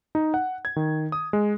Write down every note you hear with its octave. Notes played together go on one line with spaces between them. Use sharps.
D#4
F#5
G#6
D#3
D#6
G#3